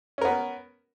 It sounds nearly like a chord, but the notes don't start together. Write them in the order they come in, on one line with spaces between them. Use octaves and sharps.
C#4 A#4 B3